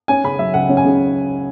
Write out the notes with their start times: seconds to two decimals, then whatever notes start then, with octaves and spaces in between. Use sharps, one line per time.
0.08 C#4 G#5
0.24 C#3 B5
0.39 F#3 E5
0.54 C#2 F#5
0.69 C#4
0.77 G#5
0.85 C#3